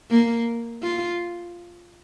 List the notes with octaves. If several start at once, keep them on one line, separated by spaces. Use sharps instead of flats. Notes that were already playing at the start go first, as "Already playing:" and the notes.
A#3
F4